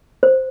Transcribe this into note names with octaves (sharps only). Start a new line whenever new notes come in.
C5